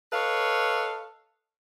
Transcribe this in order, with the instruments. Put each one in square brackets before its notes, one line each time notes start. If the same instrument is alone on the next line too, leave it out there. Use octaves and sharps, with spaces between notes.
[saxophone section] A4 B4 C#5 D#5 F5